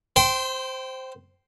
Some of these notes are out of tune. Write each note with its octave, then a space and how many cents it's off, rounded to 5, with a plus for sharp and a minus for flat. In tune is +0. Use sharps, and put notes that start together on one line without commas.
C5 +0 G5 -15 C6 -35